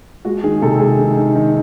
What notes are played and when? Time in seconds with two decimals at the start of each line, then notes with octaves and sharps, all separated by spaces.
0.25 G#3 F#4
0.44 D#3 G#4
0.62 C3 A4
0.80 G#3 G#4
0.99 D#3
1.17 D#3
1.35 D#3